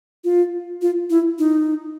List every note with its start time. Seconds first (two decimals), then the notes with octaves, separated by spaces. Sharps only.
0.24 F4
0.82 F4
1.10 E4
1.39 D#4